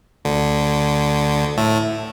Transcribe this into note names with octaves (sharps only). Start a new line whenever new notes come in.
D2 D3
A2 A3